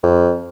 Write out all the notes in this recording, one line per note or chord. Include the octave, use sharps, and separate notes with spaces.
F2